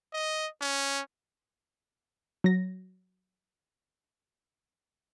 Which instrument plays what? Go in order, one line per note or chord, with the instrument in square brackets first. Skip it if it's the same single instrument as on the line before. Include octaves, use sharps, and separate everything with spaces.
[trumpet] D#5
C#4
[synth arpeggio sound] F#3 A#6